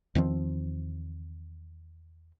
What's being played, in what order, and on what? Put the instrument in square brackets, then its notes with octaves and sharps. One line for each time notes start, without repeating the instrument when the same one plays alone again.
[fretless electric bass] E2 D#3 F3 C4